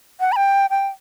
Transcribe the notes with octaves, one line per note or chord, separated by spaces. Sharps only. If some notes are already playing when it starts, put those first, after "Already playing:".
F#5
B5
G5
G5